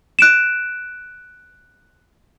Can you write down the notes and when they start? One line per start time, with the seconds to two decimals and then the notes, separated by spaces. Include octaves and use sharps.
0.19 F#6 D7 E7